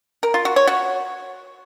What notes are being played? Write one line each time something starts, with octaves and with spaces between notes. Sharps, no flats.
A#4
F4
F#4
C#5
F#4